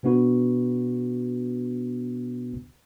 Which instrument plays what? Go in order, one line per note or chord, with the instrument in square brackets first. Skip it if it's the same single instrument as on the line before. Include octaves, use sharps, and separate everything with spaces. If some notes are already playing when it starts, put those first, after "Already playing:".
[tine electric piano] B2 B3 D4 F#4 B4